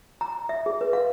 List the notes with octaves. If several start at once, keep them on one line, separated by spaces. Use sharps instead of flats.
A#5
E5
G#4
B4
F5